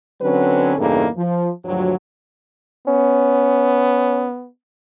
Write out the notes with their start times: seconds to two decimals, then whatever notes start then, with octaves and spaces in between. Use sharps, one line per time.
0.22 D3 F#3 C4 C#4 B4
0.78 E2 G2 C#3 A#3 D#4 A4
1.17 F3
1.65 D2 G2 F3 F#3
2.87 B3 C#4